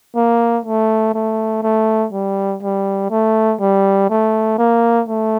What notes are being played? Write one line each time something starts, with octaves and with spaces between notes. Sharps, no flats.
A#3
A3
A3
A3
G3
G3
A3
G3
A3
A#3
A3